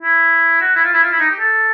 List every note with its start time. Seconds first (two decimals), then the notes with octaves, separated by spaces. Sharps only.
0.02 E4
0.61 F#4
0.75 E4
0.84 F4
0.93 E4
1.03 F4
1.11 E4
1.20 D#4
1.30 G4
1.39 A4